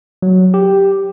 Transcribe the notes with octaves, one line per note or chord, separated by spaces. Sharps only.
F#3
G4